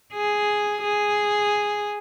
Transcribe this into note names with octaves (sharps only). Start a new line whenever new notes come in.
G#4
G#4